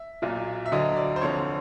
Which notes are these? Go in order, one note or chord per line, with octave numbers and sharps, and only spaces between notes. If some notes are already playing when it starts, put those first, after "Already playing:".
Already playing: E5
B1 A#2 F#3
E5
D2 D3 F#3 D#5
D5
C5
F1 F2 D3 F3 C#5